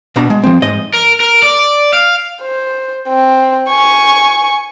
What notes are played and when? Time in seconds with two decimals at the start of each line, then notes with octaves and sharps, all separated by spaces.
0.16 B2 D4 A#5
0.30 G#3
0.43 F3 C4
0.62 G#2 D#5
0.94 A#4
1.20 A#4
1.43 D5
1.93 F5
2.42 C5
3.09 C4
3.70 G#5 C#6